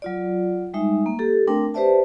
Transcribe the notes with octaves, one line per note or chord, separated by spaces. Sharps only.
F#3 F4 D5
G3 G#3 D#4 E5
A#3
G4 A4
A3 C4 D4 A#4 G5
G4 B4 C5 D5 E5 A5